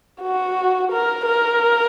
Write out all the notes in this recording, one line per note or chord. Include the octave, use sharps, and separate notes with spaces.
F#4
A#4
A#4